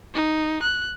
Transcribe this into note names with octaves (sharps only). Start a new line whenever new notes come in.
D#4
F#6